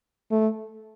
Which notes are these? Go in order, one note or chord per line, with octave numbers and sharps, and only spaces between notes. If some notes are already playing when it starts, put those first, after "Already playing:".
A3